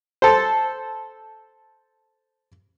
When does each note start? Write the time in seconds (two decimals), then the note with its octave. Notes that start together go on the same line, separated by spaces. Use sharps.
0.22 A4 C5